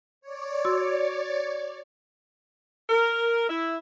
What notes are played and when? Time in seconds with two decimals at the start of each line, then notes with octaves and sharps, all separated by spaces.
0.21 C#5 D5
0.65 F#4 C6 E6
2.89 A#4
3.49 E4